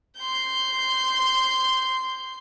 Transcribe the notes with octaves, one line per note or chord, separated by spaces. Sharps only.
C6 G6